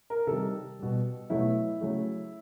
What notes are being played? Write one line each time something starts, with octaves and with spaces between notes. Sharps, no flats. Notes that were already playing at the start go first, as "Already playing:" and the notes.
A#4
C3 D#3 G3 A4
B2 G3
B2 F#3 A3 E4
C#3 F#3 A3